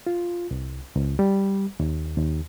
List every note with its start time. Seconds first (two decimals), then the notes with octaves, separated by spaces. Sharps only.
0.07 F4
0.51 C2
0.96 C#2
1.19 G3
1.80 D#2
2.17 D#2